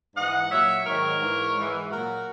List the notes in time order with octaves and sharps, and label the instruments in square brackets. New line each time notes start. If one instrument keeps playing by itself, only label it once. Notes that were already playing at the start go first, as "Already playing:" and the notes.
[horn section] G#2 E3 D#5 F#5
A#2 F#3 C#5 E5
G#2 D#3 F#3 A#4 C#5
G#2 E3
G#2 E3
A#2 F#3 F#4 A#4